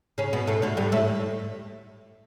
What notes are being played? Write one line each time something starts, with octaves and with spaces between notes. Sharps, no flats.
C#3 C#4
B2 B3
A2 A3
D2 D3
G2 G3
A2 A3